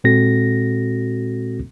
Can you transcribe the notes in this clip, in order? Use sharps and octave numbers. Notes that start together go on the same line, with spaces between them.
A#2 G#3 C4 F#4 A4 A#6